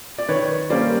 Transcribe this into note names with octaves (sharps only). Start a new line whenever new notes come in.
D5
D#3 B4 C#5
G3 A#3 C#4 C5 D5